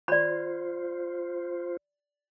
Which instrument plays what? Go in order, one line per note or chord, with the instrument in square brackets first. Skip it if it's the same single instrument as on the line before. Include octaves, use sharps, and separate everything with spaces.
[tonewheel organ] F4 C5 [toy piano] D5 B5